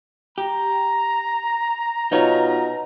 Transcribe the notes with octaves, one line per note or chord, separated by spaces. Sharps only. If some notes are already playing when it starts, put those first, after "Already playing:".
G4 A#5
B2 D#4 F4 C#5